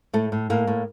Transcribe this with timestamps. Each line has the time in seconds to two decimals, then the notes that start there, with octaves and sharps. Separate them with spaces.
0.13 A2 A3
0.32 A2
0.50 A2 A#3
0.67 A2